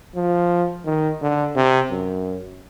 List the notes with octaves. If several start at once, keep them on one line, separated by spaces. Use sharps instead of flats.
F3
D#3
D3
C3
F#2